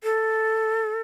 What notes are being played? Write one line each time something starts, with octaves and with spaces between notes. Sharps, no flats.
A4